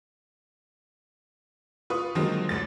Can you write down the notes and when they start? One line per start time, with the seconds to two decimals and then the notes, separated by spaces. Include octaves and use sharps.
1.90 F4 B4 C#6 D#6
2.15 D3 D#3 F3 F#3 G#3 A#3
2.49 A1 D2 A6